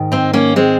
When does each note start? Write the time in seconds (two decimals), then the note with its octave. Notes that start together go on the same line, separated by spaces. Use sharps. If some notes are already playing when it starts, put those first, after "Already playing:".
Already playing: G#2 D#3
0.12 C4 D#4
0.33 A#3 C#4
0.56 G#3 C4